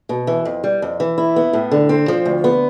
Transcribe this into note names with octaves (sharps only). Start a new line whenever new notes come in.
B2
E3
F2
G3
F2
E3
E4
B3
A2
D3
C4
F3
D2
B3